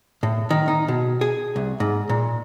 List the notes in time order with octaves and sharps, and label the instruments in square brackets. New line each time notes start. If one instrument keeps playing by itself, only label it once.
[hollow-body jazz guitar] A2
D#3
D#4
B2
G#4
C2
G#2
A#2